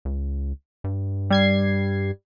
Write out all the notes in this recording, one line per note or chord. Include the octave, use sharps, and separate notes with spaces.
C#2
G2
G3 G#6 C7